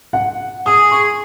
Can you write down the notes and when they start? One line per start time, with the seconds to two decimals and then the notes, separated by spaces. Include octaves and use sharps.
0.13 F#5
0.66 G#4 D#6
0.91 C#6